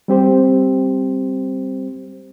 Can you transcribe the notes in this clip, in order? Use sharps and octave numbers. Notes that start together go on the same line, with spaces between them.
G3 C4 G4 C5